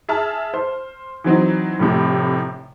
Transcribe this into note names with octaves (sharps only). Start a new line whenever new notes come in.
G#4 E5 A5 F6
C5
E3 F#3 C4 D#4
F1 A2 C3